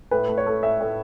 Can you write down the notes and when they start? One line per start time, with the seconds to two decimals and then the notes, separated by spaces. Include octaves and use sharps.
0.11 A2 B4
0.29 A3
0.38 C#5
0.46 A3
0.62 A2 E5
0.80 A2